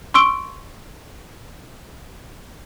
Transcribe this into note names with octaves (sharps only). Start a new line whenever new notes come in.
C6 C#6 E6 D7 G7